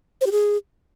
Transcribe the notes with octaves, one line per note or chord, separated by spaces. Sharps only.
C5
G4
G#4